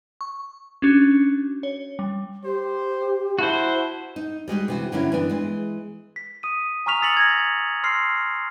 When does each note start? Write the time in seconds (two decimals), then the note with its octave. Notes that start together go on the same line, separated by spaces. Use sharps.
0.21 C#6
0.82 C#4 D4 F#4
1.63 C#5
1.99 G3
2.45 G4 C5
3.39 E4 F#4 C5 A5
4.16 D#4
4.48 G3 G#3 F#4 G4
4.68 C3 E3 F#4
4.92 G2 D3 F#3 A#3 C#4 E4
5.12 E3 B3 D4
5.29 E3 G#3
6.16 B6
6.43 D#6 D#7
6.86 G#5 A#5 C#6 F6 B6 F7
7.01 D#6 E6 A6 B6 C#7 F#7
7.17 G#6 A#6
7.83 C6 E6 F6 A#6 C7